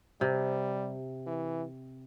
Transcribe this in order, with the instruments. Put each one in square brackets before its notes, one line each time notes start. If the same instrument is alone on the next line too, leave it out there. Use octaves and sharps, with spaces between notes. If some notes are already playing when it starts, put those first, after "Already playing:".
[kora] C3 [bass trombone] G3
[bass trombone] E3